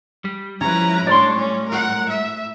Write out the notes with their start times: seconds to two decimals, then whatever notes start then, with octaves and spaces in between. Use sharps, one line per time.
0.25 G3
0.61 F3 C#4 E4 B4 A#5
1.07 A2 D4 C#5 D5 C6
1.37 C#4
1.69 A#4 F#5
2.09 E5